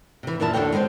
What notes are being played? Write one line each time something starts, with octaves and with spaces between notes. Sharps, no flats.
C3 E3
F#2 A#2 E3 E4 A5
D#2 D3 F#4 C#5 G5
G3 G#3 A#3 C4 C#4